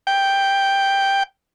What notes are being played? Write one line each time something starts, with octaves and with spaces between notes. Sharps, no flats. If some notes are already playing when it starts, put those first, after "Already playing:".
G5